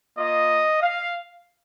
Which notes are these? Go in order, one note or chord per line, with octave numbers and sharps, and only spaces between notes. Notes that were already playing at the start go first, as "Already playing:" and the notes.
A#3 F4 D#5
F5